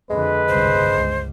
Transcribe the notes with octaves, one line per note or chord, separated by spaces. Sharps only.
F2 D3 G#3 B4
G1 C2 C#3 C5
C#2